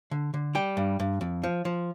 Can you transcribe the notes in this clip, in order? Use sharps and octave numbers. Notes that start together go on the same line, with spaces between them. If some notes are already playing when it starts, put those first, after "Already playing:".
D3
D3
G3 G5
G2
G2
F2
F3
F3